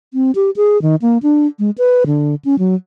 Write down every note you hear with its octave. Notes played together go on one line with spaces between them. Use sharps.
C4
G4
G#4
D#3
A#3
D4
G#3
B4
D3
C#4
F#3